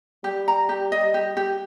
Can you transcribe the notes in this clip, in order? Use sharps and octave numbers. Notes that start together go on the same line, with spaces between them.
G3 G4
A#5
G4
D#5
G4
G4